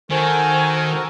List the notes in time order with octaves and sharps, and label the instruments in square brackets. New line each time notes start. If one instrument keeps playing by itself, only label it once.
[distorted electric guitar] D#3 [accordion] F#4 A4 A#4 [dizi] C5 [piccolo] G#5